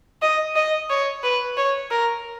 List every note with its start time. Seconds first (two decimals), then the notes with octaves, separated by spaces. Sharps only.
0.22 D#5
0.56 D#5
0.90 C#5
1.23 B4
1.57 C#5
1.91 A#4